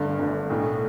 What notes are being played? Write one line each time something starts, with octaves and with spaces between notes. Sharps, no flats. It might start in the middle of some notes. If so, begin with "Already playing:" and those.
Already playing: G1 G2 D3 A3
G1 G2 D3 A3
B1 A2 A3